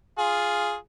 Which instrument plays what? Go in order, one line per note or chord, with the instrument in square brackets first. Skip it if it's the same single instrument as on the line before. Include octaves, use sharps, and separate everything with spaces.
[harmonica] F4 G#4